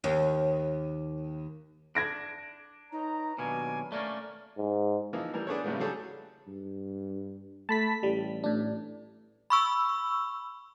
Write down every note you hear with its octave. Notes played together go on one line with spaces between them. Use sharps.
D#2
D4 G#6 A#6 D7
D#4 B4 C#5 A#5
D#2 B2 F#3 A#3 D4 B4 G#5
A3 A#3 C#4 D5
G#2
E3 F3 A#3 D#4
E3 G3 A#4
B3 D4 G#4 A4 B4 C#5
A2 C#3 G3 G#3 A#3 B3
F#3 G3 G#4 A4 C#5
G2
A3 A5 B5 B6
A1 G3
A2 D4
B5 C#6 E6